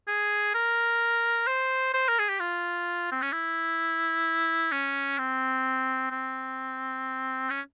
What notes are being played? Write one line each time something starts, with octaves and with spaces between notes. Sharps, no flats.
G#4
A#4
C5
C5
A#4
G#4
G4
F4
C4
C#4
E4
C#4
C4
C4
C#4